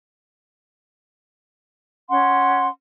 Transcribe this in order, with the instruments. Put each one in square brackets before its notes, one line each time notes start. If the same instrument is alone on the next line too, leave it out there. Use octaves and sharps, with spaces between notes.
[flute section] C#4 F#5 C6